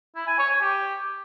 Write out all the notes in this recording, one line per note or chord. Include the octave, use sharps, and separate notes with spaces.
E4
G#5
C#5
G#5
G4